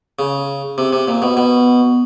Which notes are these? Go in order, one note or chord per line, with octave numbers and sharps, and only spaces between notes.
C#3
C3
C3
A#2
B2
B2